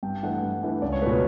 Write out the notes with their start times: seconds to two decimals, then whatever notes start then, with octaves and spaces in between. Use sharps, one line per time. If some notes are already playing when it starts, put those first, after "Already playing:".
0.03 G2 G5
0.23 E3 A3 D4 F#5
0.43 G2
0.63 E3 A3 D4
0.82 C#2 D5
0.92 C#5
1.01 B2 A3 B4
1.12 B4